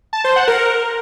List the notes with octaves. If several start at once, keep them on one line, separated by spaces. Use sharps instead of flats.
A5
C5
F#5
A#4